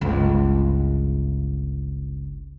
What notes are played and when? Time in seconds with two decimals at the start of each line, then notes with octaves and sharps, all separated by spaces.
0.01 G1 C#2